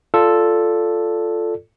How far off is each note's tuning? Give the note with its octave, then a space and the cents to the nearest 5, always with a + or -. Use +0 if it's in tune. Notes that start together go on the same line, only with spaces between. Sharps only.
F4 +0 A4 +0 D5 +0